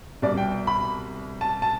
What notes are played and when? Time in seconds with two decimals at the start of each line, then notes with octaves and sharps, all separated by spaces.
0.22 C2 B2 D5
0.37 G5
0.67 B5
1.41 A5
1.62 A5